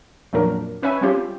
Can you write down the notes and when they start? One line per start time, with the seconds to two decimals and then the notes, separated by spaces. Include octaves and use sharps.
0.33 F2 A#2 F#3 D4 A#4
0.83 C#4 B4 C#5 E5 G#5
1.01 G3 C4 C#4 F4 G4